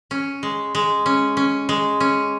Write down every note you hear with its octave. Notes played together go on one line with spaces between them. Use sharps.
C#4
G#3
G#3
C#4
C#4
G#3
C#4